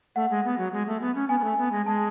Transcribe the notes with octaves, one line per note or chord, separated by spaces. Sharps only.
A3 F#5
G#3
B3
F#3
G#3
A3
B3
C#4
B3 G#5
B3
A3
B3
G#3
G#3 A5